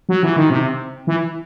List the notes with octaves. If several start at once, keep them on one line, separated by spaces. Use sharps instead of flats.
F#3
E3
D#3
C3
E3